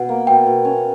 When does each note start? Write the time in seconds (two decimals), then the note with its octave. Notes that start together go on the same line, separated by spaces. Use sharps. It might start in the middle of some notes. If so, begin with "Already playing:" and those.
Already playing: B2 F#5
0.09 A#3
0.27 B2 G5
0.47 B2
0.65 C#4